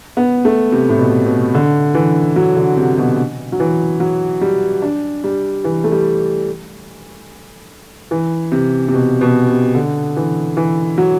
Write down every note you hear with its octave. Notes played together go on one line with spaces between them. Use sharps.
B3
A3
C3
A2
B2
B2
D3
E3
F#3
D3
C3
B2
F#3
E3
F#3
G3
D4
G3
E3
A3
G3
E3
C3
C3
B2
B2
C3
D3
E3
E3
F#3